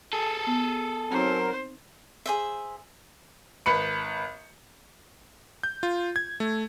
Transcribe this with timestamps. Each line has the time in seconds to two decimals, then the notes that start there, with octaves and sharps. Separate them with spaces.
0.13 G#4 A4
0.47 B3
1.11 F#3 C4 D#4 A#4 C5
2.26 G#4 C5 E5
3.66 G#1 B4 B5 C#7
5.63 G6
5.83 F4
6.16 G#6
6.40 A3